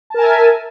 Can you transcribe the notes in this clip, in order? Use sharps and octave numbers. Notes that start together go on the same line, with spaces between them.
A#4 E5 G#5 A5